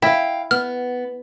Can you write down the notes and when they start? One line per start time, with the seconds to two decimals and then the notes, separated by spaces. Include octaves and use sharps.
0.02 E4 F5 G5
0.51 B3 F6